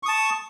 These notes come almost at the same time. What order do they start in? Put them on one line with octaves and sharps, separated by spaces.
C#6 D#6 A5